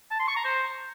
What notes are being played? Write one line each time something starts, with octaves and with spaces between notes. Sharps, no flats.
A5
C6
C#6
A#5
C5